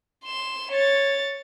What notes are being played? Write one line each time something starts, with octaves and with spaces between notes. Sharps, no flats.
C6 E7
C#5 A6